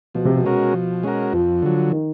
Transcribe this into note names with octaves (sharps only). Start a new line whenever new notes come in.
B2 F3
C3
B2
G#3 C#4 F#4 A#4
F3
G#3 C#4 F#4 A#4
F2 F3
D3 F#3
D#3